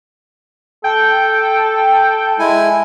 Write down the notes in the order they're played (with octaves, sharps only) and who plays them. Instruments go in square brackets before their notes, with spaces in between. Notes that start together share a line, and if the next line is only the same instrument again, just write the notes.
[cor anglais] A4 [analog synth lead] G5
[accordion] G#3 E4 G#5